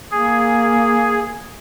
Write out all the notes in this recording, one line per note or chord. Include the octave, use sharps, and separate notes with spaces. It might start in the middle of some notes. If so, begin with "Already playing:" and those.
A#3 G#4